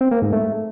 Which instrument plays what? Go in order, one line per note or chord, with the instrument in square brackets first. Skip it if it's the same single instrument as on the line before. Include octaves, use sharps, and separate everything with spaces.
[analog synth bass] C4
A#3
G#2
A3